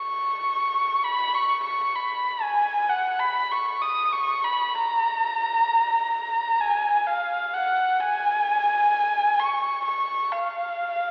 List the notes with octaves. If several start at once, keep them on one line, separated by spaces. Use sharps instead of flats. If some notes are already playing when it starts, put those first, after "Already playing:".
Already playing: C#6
B5
C#6
C#6
B5
G#5
F#5
B5
C#6
D#6
C#6
B5
A#5
G#5
F5
F#5
G#5
C#6
C#6
F5